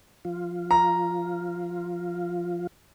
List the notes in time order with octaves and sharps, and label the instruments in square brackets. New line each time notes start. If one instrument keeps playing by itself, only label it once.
[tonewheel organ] F3 F4
[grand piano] A#5